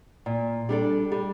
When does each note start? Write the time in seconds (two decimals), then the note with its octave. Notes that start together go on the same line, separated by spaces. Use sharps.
0.26 A#2
0.69 G3 D4 A4
1.12 G3